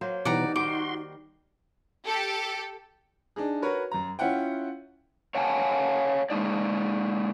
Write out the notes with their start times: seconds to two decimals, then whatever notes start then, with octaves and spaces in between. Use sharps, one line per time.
0.01 F#3 A#3 C5
0.25 B2 E3 G3 D#4 D5 F#5 A#5
0.56 D#3 G3 F#4 C6 D6
2.06 G4 A4
3.36 D4 D#4 G#4
3.62 F#4 A#4 B4 C#5
3.92 F#2 A#5
4.19 C#4 E4 F4 F#5 G5
5.35 C#5 F5 F#5 G#5 A5
6.30 G#3 A#3 D#4 D5